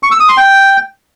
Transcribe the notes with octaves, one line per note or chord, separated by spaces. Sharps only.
C#6
E6
D#6
C6
G5